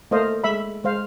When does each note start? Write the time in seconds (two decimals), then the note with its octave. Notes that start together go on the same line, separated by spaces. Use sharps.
0.11 A3 A#3 C5 D#5 F5
0.44 G#3 E5 B5
0.84 G#3 C5 F5